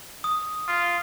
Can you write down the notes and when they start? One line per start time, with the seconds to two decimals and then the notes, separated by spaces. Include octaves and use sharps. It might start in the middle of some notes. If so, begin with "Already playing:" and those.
0.24 D#6
0.68 F4